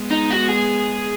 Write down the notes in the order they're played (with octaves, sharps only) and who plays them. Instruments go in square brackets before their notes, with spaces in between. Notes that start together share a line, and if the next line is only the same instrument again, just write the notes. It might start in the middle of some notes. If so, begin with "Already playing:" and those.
Already playing: [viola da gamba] G#3 B3
[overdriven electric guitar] D#4
F#4
G#4